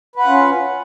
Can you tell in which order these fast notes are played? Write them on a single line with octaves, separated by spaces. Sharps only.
B4 F#5 F4 C#4